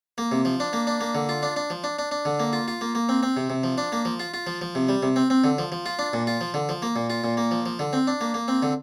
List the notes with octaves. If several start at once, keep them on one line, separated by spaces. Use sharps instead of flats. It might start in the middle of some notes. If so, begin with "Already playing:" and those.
A#3
C3
F3
D4
A#3
D4
A#3
D3
F4
D4
D4
F3
D4
D4
D4
D3
A#3
F4
F4
A#3
A#3
C4
C4
C3
C3
F3
D4
A#3
F3
F4
F4
F3
F3
C3
G3
C3
C4
C4
D3
F3
F3
F4
D4
A#2
F4
F3
D3
F3
A#3
A#2
F4
A#2
A#3
F3
F3
D3
C4
D4
A#3
A#3
C4
D3